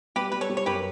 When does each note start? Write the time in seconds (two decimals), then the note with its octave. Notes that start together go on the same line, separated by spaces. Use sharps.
0.16 G3 G4 B4
0.32 G3 B4
0.41 A4 C#5
0.50 G3
0.57 C#5
0.66 F#2 G4 B4